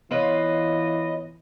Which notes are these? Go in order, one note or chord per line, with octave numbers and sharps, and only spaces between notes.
E3 B3 F4 B4 C#5 D#5